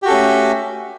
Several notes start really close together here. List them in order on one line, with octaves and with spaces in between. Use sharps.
G4 F#4 A4 C#4 A3